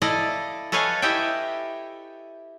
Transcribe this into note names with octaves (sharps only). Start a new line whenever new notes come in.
E4 A4 D5 D#5 F5
A4 B4 C#5 D#5 F5 G#5
E4 G4 D#5 E5 G5